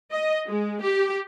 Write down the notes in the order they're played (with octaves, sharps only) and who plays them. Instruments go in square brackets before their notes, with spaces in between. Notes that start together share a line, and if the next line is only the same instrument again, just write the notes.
[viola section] D#5
G#3
G4